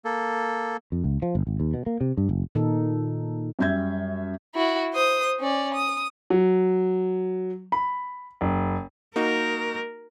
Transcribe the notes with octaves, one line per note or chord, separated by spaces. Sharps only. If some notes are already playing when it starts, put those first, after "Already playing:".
A#3 A4
F2
C#2
F3
G1
G#1
D#2
B2
A#3
C3
G2
F#1
A#2 D#3 D#4 A4
F#2 G3 E5 G6 G#6
E4 F#4
C5 D#6
C#4 D5
D#6
F#3
B5
F#1
A#3 D#4 F#4 A#4